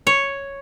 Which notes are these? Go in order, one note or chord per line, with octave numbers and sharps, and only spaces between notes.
C#5